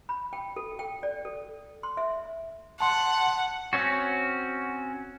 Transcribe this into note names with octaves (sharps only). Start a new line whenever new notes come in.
B5
G5
A4
G5
D5
A4
C6
E5
F#5 A5 C6
C4 C#4 F#4